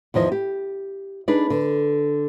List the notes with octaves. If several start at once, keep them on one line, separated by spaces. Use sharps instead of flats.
E2 D#3 F3 D#5
G4
D4 D#4 G#4 B4
D3